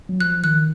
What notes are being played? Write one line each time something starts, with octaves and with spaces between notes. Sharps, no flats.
F#3
F3 F#6
D#3 F#6